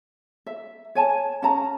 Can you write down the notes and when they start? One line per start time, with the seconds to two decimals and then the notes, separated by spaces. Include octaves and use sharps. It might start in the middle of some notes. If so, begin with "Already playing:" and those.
0.46 E5
0.95 C#5 G#5 A5
1.42 C#4 A5 A#5